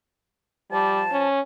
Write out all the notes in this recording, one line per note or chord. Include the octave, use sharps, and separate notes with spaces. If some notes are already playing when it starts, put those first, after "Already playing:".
F3 G3 C5 A5
C#4